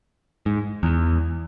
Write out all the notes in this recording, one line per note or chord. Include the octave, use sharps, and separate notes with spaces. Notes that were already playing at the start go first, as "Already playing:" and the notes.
G#2
E2